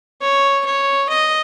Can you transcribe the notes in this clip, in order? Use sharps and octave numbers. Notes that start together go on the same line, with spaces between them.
C#5
C#5
D#5